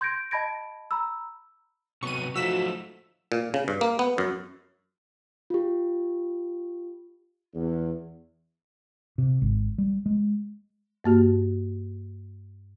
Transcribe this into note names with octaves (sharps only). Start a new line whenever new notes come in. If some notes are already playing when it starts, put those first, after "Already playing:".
C6 G6 G#6 A#6 D7
D#5 A5 B5 G#6 A#6 D7
A#5 B5 E6
C3 F#3 B3 C#6 D#7
F3 F#3 A3 D#4 F#4 E6 B6 E7
A#2
C#3
G2
A#3
B3
F#2
F4 G4
E2
C3
G#1
G3
G#3
G2 A#3 F#4 G4